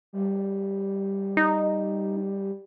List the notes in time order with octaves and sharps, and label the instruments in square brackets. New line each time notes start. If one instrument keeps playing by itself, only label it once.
[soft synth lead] G3
[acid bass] D#4